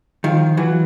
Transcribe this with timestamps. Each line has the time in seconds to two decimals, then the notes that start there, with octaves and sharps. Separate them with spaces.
0.24 D#3 F3
0.57 E3 F#3